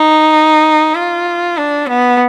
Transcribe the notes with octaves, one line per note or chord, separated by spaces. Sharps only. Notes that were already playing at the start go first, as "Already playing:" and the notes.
Already playing: D#4
F4
D4
B3